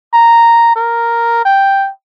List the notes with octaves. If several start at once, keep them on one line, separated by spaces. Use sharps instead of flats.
A#5
A#4
G5